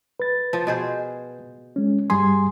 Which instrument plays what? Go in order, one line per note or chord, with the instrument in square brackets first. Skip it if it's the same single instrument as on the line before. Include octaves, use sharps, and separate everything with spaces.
[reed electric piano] B4 A6
[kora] F3
B2 G#4 C5
[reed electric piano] G#3 C#4
[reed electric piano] G2 G3 C6 [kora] G#4